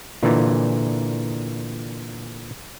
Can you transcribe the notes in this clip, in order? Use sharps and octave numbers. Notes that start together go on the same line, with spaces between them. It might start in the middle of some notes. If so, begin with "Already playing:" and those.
A#2 D3 E3